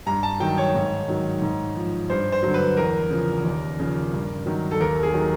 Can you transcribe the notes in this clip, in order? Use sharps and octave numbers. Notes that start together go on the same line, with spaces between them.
G2 A#5
A5
D#3 F#3 G5
C#5
G#2
D#3 F#3
G#2
F3
G2 C5
C5
D3 F#3
B4
E2 A#4
C#3 F3
D#2
C#3 F3
G2
D#3 F#3
A4
D#2 A#4
G#4
D#3 F#3